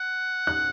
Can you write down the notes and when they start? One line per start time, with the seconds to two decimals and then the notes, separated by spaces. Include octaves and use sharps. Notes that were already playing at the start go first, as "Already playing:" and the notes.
Already playing: F#5
0.47 F#6